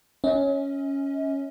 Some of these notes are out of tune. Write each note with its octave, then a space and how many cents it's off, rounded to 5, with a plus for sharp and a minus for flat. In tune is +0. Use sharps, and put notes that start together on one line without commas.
C#4 +0 D#5 +45